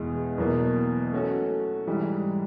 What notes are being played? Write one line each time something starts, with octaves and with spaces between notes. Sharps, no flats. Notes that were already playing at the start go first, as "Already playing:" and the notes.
Already playing: E2 B2 G#3
E2 B2 F#3 A#3
A3 C#4 F#4 A4
G#2 E3 G3